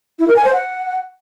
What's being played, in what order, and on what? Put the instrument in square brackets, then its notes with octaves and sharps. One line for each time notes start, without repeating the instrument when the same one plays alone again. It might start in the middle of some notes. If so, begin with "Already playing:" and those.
[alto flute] E4
A#4
G#5
C5
F#5